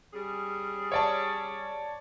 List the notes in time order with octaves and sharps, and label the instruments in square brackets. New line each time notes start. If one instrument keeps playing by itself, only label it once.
[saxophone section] G3 C#4 G#4
[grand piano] C#5 D5 A5